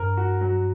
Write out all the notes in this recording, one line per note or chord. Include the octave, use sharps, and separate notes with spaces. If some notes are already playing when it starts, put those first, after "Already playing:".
Already playing: G2 A#4
F#4
F#3